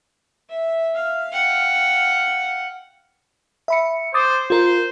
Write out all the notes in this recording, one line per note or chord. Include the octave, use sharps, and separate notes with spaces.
E5
F5
F#5 G5
E5 B5 C#7
C5 D6 D#6 A6
F4 A#4 C5